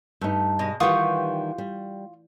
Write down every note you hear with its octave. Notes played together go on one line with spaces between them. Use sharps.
G2 A3 D#4
B2 G#3 D#5
D#3 E3 G3 F4 G4 F#5 C#6 D#6
G3